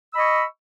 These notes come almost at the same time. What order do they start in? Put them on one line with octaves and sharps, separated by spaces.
E6 B5 D#5 C#6